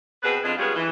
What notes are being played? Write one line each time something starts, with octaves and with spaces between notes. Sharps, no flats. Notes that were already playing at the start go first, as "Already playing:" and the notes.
B2 C4 G#4 B4
F2 D4 F4 G#4 D#5
G3 G#3 B3 C#4 F4 G#4
E3